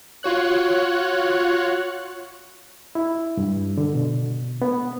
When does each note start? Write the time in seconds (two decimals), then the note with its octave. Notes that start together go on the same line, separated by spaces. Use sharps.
0.23 F4 F#4 C#5 F#6
2.95 E4
3.37 G2
3.77 D3
3.94 B2
4.62 B3